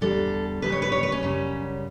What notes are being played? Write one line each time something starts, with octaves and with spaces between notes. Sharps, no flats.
E2 D3 G3 A4
D2 C#3 G3 B4
C#5
B4
C#5
B4
C#4
F#2 C#3 G3